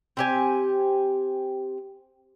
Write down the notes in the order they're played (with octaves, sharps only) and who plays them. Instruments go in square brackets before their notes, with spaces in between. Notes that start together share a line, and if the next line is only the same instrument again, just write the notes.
[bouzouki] C4 G4 G#5